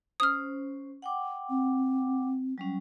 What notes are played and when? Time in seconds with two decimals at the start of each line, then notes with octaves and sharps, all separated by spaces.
0.20 C#4 C5 D#6 F6
1.02 F#5 G5 D6
1.50 C4
2.58 F#3 G3 C#4